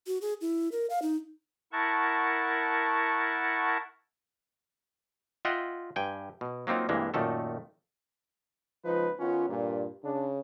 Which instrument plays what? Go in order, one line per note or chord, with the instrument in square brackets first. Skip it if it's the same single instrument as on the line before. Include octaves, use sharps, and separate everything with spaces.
[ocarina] F#4
G#4
E4
A#4
F5
D#4
[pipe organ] E4 A#4 F#5 A5 C#6
[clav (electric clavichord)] F4 D#5 E5 F#5 G5
G2 G5 G#5
B2
F#3 A#3 C4 D#4 F4
C2 G2 E3 G#3 A#3
F#2 A#2 D#3 A3 A4
[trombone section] C#2 D#4 B4 [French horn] F3
[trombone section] D#3 B3 C#4 [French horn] F4
[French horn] G2 [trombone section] A#2
[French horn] C#3 [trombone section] D4